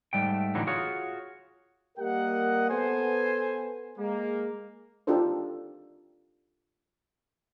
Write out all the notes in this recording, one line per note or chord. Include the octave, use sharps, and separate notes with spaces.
G#2 G3 A3 G5
A2 D3 E3 F#3 D#4
F4 F#4 G#4 C#5
G3 A#3 G4 A#4 D#5 F#5
B3 A4 C5 G#5
G#3 A#3
D4 D#4 F4 G4 A4 C5